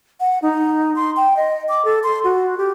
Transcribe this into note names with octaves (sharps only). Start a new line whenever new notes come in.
F#5
D#4
C6
G5
D#5
D6
A4
C6
F#4
G4